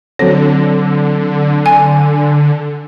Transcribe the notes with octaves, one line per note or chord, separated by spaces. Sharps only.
D3 F#3 C4 A4 C#5
G#5